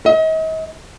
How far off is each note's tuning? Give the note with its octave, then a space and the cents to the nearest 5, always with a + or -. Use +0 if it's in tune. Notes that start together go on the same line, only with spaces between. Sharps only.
D#5 +40